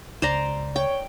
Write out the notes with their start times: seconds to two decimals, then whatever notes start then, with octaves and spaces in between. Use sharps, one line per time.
0.22 C#2 C5 D5 A#5
0.76 C#5 G5